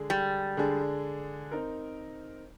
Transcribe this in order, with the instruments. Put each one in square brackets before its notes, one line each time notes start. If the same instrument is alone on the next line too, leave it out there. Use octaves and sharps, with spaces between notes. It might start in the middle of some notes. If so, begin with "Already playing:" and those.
Already playing: [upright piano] D3 G#3 D4 G#4
[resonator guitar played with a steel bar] G3
[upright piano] D3 G#3 D4 G#4
C4 D#4 A#4